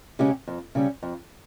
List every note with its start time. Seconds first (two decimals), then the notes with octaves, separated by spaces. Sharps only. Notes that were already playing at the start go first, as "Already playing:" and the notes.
0.19 C#3 G#3 C#4 G4
0.47 F2
0.75 C#3 G3 C#4
1.03 F2